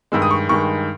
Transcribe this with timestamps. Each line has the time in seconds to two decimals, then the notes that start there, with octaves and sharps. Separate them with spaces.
0.12 G2 D#3 G#3 E6
0.22 D#6
0.31 C#6
0.49 G2 D#3 G#3 C#6